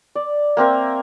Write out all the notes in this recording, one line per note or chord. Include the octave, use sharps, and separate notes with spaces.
D5
A#3 C4 A#4 E5